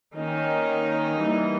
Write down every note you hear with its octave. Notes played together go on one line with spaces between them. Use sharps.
D#3 A#3 C#4 D#4
E3 G3 A#3